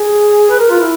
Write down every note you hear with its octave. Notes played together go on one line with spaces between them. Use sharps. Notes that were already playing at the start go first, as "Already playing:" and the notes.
Already playing: G#4
B4
A#4
F4
E4